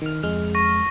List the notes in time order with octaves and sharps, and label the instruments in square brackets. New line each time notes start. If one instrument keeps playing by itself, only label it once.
[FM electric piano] D#3 F6
F2 G#3 F6
[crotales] C#6 A#6